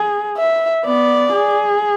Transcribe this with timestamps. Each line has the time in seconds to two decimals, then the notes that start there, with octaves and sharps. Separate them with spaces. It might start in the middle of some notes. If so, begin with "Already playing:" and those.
Already playing: G#4
0.38 E5
0.85 B3 D5
1.32 G#4